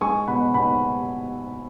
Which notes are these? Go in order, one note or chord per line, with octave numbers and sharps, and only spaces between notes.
G#3 G#5 C#6
B2 F#5 B5
B2 F#5 B5